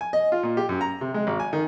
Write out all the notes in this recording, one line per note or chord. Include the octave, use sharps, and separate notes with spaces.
G#5
D#5
F4
A#2
G4
F#2
A#5
C3
G#3
G#1
G#5
D#3